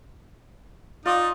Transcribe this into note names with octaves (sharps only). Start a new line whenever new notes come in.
D#4 F4 D5 D#5